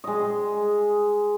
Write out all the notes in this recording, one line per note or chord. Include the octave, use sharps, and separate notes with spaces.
G#3 D#5